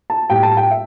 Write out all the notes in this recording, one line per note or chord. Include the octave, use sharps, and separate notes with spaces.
A5
A2 G3 G5
A5
G5
E5